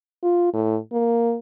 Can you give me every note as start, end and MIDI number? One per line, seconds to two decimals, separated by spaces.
0.23 0.49 65
0.54 0.77 45
0.93 1.36 58